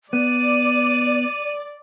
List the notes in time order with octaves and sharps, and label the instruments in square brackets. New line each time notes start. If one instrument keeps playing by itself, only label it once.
[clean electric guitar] B3 [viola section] D5 [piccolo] D#7